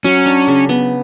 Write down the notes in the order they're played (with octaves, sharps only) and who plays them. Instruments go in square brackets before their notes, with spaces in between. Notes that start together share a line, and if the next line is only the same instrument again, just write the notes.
[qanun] F#3 [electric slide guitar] C#4
[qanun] D4
C#3
B3